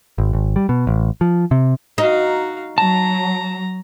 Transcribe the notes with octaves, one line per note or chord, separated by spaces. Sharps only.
G#1
G#1
G3
B2
A1
F3
C3
D#4 F#4 F5
F#3 A5 A#5